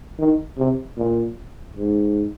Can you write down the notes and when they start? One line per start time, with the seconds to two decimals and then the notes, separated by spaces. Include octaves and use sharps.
0.19 D#3
0.58 C3
0.97 A#2
1.77 G#2